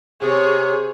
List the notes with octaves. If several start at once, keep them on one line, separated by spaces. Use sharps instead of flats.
C3 G#4 C#5